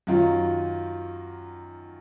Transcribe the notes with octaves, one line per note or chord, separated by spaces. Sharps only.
F#2 D#3 F#3 F4